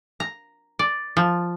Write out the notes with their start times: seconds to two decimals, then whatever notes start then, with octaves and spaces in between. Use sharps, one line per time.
0.20 A#5
0.79 D5
1.17 F3